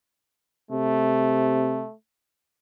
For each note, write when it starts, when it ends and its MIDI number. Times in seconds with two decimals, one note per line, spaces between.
0.71 1.85 48
0.71 1.94 57